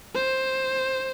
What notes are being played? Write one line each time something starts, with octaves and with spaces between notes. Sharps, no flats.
C5